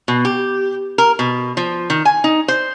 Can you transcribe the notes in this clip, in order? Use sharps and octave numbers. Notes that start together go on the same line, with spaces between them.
B2
G4
A#4
B2
F3
D#3
G#5
D#4
C5